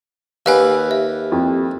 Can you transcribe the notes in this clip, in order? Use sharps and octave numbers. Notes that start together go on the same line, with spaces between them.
D#2 G4 B4 F5 F#5 G#5
E5
F2